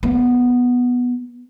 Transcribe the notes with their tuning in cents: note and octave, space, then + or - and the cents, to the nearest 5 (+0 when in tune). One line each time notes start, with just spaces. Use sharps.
B3 -5